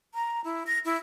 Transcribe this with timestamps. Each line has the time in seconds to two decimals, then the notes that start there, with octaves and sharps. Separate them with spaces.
0.14 A#5
0.44 E4
0.67 A#6
0.85 E4